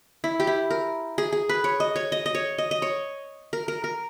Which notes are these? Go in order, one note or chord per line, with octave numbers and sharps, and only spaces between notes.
E4
G4
E4
A#4
G#4
G#4
B4
C#5
D#5
C#5
D#5
D#5
C#5
D#5
D#5
C#5
A#4
A#4
A#4